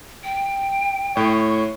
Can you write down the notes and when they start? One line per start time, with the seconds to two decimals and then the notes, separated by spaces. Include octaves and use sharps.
0.24 G5
1.17 A2 C#5